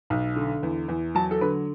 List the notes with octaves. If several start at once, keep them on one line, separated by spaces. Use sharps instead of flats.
B1
D3
E2
E2
F#3 A5
A4
D3 B4